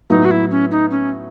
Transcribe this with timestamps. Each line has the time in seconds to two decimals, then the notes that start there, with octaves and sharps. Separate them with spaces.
0.10 A2 F#3 B3 D#4
0.25 F#4
0.31 E4
0.51 C#4
0.71 D#4
0.91 C#4